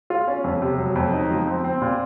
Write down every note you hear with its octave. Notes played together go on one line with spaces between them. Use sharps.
F4
C#4
F2
C3
F#3
F2
D#4
F3
C4
C4
A#2